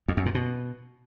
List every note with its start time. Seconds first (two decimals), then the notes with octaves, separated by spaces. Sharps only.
0.08 F2
0.17 F#2
0.26 A#2
0.35 B2